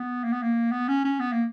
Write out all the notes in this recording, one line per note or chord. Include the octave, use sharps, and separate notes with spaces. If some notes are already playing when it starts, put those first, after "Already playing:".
Already playing: B3
A#3
B3
A#3
B3
C#4
C#4
B3
A#3